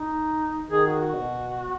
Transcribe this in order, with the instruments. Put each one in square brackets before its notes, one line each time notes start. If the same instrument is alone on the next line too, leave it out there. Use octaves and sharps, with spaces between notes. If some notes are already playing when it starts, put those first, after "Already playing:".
Already playing: [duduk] D#4
[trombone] D#3 [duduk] G#4
[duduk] F#4
F#4
[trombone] B2